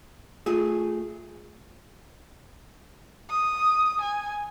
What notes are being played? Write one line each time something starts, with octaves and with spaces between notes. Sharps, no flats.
A3 F4 G#4
D#6
G#5